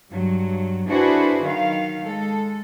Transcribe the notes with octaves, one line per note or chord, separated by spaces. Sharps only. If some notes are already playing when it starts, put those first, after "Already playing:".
G2 F#3
D4 E4 F#4 G#4 B4 C5
D#3 F#3 F5
G#3 A4